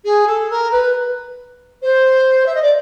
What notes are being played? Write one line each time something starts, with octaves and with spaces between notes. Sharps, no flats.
G#4
A4
A#4
B4
C5
E5
D#5
D5